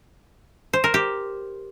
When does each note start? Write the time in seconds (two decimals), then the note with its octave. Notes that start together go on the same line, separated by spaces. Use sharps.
0.73 C5
0.84 A#4
0.94 G4